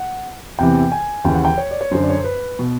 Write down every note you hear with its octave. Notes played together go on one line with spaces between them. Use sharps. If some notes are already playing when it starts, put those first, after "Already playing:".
Already playing: F#5
E2 C3 E3 G5
G#5
D#2 C#3 E3 G5
F#5
G5
C#5
D5
C#5
F#2 D3 C5
D5
C#5
C5
B4
B2